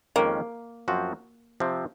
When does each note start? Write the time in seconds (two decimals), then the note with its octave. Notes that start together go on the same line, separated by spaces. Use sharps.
0.16 F2 D#3 G#3 A#3 C#4
0.88 F#2 F3 C4 F#4
1.60 C3 F3 C4